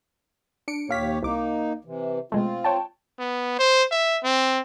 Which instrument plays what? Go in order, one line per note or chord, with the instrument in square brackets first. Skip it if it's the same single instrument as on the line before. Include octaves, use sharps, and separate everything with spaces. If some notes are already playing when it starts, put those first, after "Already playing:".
[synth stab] D4 C#7 D7
[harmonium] D#2 G4 C#5 [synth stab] A#2 F5 B6
[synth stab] C2 D6 [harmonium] A#3 D#4
[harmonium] C3 E3
[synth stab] B2 G#3 A3 [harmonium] C4 F4
[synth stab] C#5 G5 A5
[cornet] B3
C5
E5
C4